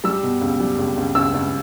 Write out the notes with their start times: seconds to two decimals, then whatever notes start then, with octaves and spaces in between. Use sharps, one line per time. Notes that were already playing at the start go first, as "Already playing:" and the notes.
0.04 G3 E6
0.23 B2
0.42 C#2
0.60 G3
0.78 C#2
0.97 C#2
1.15 C#2 E6
1.34 C#2